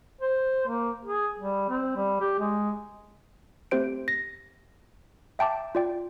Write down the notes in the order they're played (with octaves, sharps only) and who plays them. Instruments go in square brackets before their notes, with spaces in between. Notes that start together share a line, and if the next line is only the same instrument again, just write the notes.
[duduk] C5
A#3
G#4
G3
C4
G3
G4
G#3
[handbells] A3 C4 G4 C5 D7
A#6
E5 G5 A5 D6
F4 D5 G5